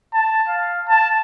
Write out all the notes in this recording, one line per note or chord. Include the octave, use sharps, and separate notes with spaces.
A5
F5
A5